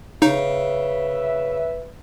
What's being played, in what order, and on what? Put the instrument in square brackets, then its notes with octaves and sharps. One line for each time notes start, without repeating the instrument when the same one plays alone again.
[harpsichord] C#3 [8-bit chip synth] D#4 [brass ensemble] B4 E5